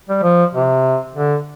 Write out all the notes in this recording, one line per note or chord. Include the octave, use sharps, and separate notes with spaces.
G3
F3
C3
D3